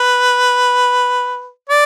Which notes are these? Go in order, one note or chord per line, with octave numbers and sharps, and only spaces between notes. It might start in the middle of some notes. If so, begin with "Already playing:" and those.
Already playing: B4
D5